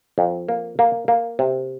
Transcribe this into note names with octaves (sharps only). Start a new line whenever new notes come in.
F2
A#3
A#3
A#3
C3